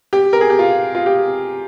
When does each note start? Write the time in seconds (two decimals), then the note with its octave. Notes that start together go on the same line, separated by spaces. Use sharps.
0.13 G4
0.33 A#4
0.41 G#4
0.50 G4
0.59 F4
0.95 F4
1.06 G4